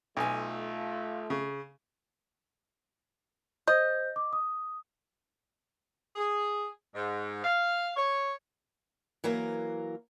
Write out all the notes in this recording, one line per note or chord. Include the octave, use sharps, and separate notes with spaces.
B1 A3 F4 G#5
C#3
C5 D#5 G6
D6
D#6
G#4
G#2
F5
C#5
E3 F#3 A#3 A#4